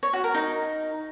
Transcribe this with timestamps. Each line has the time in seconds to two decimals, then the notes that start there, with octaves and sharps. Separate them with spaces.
0.03 C#5
0.13 F#4
0.24 A#4
0.34 D#4